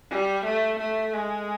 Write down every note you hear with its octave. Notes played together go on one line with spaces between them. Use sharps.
G3
A3
A3
G#3